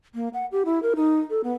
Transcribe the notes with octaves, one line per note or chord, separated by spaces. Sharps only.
A#3
F#5
G4
E4
A#4
D#4
A4
B3